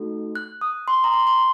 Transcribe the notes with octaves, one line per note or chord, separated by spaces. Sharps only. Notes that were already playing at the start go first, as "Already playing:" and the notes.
Already playing: A3 D#4 F#4 A4
F#6
D#6
C6
A#5
C6
C6